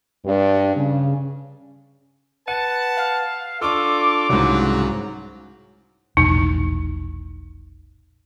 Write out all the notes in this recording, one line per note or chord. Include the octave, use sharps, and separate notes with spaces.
G2
C#3
B4 F#5 A5 D#7
F5
D4 F4 A4 C#6 D6 E6
C2 G#2 C#3 F#3
E1 A#1 A2 D#4